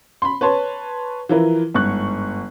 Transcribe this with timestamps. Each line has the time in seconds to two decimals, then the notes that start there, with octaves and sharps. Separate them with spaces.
0.22 B5 C6
0.41 B4 C#5 A5 C6
1.29 E3 F3 E4 F4 A#4 B4
1.74 G1 G#2 C#6 F#6